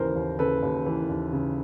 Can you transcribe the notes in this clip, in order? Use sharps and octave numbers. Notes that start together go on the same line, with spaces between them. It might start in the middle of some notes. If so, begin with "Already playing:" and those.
Already playing: D#2 C#3 E3 A#4 C5
D#2
C#3 A4 B4
D#2
E3
D#2
C#3